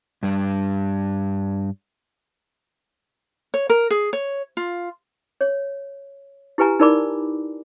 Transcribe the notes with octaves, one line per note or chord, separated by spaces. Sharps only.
G2 G3
C#5
A#4
G#4
C#5
F4
C#5
E4 G4 B4 G#5 A#5
D#4 E4 A#4 D5 B5 D6